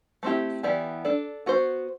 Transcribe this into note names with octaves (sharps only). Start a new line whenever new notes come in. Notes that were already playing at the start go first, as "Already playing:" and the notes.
A3 C4 E4 G4
E3 B3 E4 G4 D5
D4 A4 D5
B3 F#4 C5